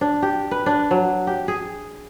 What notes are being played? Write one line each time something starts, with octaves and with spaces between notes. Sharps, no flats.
D4
G4
B4
D4
F#3
G4
G#4